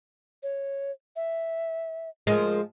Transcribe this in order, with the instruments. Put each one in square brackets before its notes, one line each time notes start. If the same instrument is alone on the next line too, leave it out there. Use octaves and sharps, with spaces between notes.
[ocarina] C#5
E5
[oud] F3 G#3 [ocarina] A#4